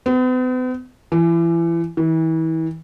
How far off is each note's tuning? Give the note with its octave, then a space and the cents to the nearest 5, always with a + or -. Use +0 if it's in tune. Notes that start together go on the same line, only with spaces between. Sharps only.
B3 +45
E3 +30
E3 -35